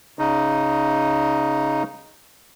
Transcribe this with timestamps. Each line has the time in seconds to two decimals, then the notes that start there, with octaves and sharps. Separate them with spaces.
0.19 C#3 D#4